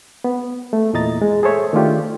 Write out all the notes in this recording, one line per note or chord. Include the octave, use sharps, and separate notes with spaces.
B3
A3
E2 A#2 E4 D#5 A#5 A6
G#3
G#4 A4 C5 C#5 E5
D#3 A3 D4 F4 G4